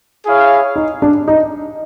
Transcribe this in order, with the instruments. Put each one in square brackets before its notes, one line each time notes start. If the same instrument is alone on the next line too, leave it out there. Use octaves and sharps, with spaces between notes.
[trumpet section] E4 G#4 C#5 F5
[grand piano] D#4
D4
D#4